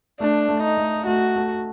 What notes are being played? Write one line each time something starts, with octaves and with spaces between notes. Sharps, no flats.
A3 D4
A3
D#4
A3
A3 F#4
A3